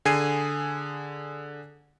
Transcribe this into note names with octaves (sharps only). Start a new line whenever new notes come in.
D3 G#4 G#5 G#6 C7 D#7